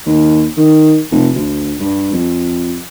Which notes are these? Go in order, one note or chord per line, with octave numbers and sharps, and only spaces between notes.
D#2
D#3
F1
D2
G2
F2